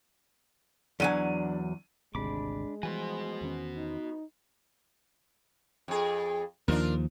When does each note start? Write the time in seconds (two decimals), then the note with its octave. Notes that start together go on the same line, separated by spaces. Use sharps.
1.00 E2 F#3 D4 G#5 D#7
2.15 G#1 D2 C3 G#3 D4 B5 D6
2.83 E3 F3 G3 F#4 B4 C5 G#5
3.41 E2 D#3 C#4
3.77 D#4
5.88 F2 G#4
6.68 D#2 F3 D4 F4 A#4